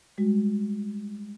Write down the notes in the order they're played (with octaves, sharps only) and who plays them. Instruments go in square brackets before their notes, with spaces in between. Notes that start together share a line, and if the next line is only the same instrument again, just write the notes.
[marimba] G3 G#3 F#4